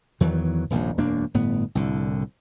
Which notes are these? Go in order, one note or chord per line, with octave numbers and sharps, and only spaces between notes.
E2 D#3 E3 F#3
D#1 A#1 G#2
E1 F#2 A#3 D4
G1 A2 B3
C2 A2 D3